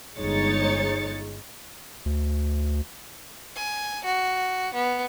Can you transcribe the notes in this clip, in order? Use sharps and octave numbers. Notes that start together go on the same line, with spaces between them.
G1 G#3 D#4 C#5 A6 C#7
D2
G#5
F#4
B3